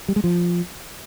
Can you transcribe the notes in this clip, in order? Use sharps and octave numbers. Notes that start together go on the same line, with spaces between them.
G3
G#3
F3